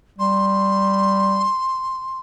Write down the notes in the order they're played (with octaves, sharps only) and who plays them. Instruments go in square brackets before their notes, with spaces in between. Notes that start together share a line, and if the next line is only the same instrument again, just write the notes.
[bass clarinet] G3 [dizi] C6